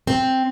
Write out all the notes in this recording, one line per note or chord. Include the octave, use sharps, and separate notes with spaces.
C4